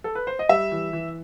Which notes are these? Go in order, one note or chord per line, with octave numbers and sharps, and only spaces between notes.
A4
B4
C5
D#5
G3 E5
E3
E3